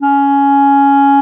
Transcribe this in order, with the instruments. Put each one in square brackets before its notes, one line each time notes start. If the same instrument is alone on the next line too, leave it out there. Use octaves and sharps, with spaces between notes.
[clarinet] C#4